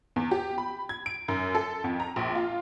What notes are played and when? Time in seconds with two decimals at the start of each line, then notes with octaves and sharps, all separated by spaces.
0.16 E2
0.31 G4
0.58 B5
0.89 G#6
1.06 D7
1.28 F#2
1.55 A4
1.84 F2
2.00 A#5
2.16 A#1
2.35 F4